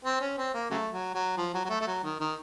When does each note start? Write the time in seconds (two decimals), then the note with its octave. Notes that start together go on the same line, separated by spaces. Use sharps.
0.05 C4
0.21 C#4
0.38 C4
0.54 A#3
0.71 C#3 F#3 A3
0.93 F#3
1.14 F#3
1.37 F3
1.54 F#3
1.65 F#3
1.69 A3
1.81 A3
1.87 F#3
2.04 D#3
2.20 D#3